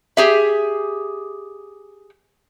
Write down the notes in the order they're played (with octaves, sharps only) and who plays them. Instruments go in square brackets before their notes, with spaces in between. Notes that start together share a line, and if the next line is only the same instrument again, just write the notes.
[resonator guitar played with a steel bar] G4 G#4 E5